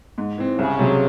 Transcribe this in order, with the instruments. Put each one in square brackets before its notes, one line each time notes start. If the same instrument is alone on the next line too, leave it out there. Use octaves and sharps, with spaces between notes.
[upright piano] G#2
E3 C4
[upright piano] C2 [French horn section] C#3
[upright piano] C3 F#3